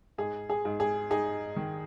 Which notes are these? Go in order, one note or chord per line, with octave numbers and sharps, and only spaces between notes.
G#2 G#4
G#4
G#2
G#4
D#4 G#4
D#3